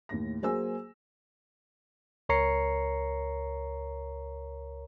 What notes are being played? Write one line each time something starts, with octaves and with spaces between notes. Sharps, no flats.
D#2 A2 A#6
F#3 A#3 G#4 C5 G#5 E6
C#2 A#4 C#5 A#5 C7 C#7